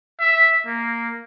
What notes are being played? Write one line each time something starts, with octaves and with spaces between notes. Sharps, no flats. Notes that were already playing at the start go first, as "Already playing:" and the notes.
E5
A#3